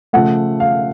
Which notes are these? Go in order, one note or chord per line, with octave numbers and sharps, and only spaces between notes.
C#3 F3 A3 F#5
F5